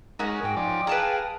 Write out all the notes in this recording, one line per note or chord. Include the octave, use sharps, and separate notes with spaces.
G#3 C#4 D#4 F#4 A#4
G#2 G5
F3 D#4 D5
G#4 B4 F5 A5 A#5